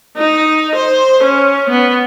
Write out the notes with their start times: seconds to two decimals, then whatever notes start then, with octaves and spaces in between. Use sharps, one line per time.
0.17 D#4
0.76 C5
1.24 C#4
1.70 B3